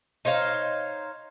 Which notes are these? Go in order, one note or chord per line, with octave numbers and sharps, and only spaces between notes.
D#4 C5 C#5 F5